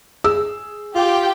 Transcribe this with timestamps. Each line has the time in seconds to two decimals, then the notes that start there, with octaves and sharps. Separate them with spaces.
0.24 G#4 E6
0.95 F4 G4 G5